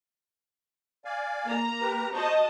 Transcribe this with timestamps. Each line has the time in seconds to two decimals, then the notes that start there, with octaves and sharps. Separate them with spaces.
1.05 D5 F5 G#5
1.45 A#3 A#5
1.81 G4 A#4 B4
2.13 F#4 C5 D#5 A5 A#5 C#6